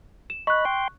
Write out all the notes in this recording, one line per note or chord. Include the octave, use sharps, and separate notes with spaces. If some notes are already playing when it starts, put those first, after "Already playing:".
E7
D#5 B5 C#6 F#6
G5 C6